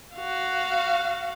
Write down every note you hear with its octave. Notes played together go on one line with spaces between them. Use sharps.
F#4 F5